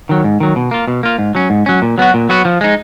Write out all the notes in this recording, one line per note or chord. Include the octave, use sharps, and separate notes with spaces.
D#3 F#3
G#2
D#3 F#3
B2
A#3 F4
B2
A#3 F4
G#2
F#3 C#4
G#2
F#3 C#4
A#2
F#3 B3 F#4
A#2
F#3 B3 F#4
F3
G#3 D#4